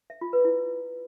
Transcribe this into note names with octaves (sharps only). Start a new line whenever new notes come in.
E5
F4
B4
E4